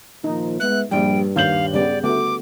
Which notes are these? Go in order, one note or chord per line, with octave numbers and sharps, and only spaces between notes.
A#2 D#3 F3 D#4
G#3 B3 E5 F#6
A#1 G2 G3 G5
D#2 F5 G6 F#7
C#3 G3 B3 D5
D3 A3 B3 F#4 D6